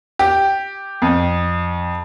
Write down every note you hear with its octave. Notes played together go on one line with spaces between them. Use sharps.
G4
F2